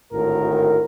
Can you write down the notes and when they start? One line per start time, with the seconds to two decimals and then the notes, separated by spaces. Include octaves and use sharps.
0.12 G#1 D2 A2 D#3 F#4 A#4